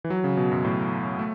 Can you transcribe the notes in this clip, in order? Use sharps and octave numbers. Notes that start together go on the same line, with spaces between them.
E3
F#3
C#3
B2
F#2
A2
A3